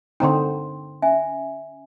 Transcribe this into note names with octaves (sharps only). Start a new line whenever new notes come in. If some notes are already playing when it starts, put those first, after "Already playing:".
D3 C4 D#4 G5 A#5 C6
C#4 E5 G#5